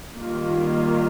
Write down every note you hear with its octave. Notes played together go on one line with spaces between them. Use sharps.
D#3 G3 A#3 F4